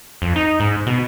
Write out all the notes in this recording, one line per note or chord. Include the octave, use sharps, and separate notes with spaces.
F2
D#4
G#2
B2